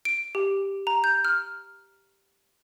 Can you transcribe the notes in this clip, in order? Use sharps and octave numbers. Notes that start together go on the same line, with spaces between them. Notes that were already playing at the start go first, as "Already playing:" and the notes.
D7
G4
A#5
G6
F6